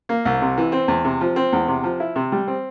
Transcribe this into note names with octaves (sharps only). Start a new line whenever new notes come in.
A#3
C2
C3
E3
C4
E2
C3
F3
C4
E2
C3
F3
E4
C3
G3
C4